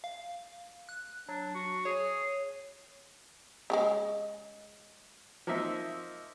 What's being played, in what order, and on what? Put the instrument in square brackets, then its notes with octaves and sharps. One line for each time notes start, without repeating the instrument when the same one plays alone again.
[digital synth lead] F5
F#6
[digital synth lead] F#3 [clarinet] D4
[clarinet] F#4
[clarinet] G#4 [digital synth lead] C#5
[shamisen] C#3 F#3 G#3
[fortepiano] F3 A#3 C4 D#4 E5